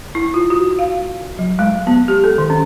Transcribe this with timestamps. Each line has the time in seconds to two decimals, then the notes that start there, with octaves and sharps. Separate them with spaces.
0.15 E4
0.34 F4
0.50 F#4
0.79 F5
1.39 F#3
1.59 G#3
1.87 B3
2.08 G4
2.24 A4
2.38 D#3
2.50 C#4